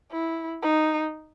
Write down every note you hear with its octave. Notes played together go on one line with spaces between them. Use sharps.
E4
D#4